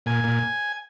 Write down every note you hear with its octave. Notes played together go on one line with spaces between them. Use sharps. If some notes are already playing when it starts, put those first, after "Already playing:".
A#2 G#5
A#2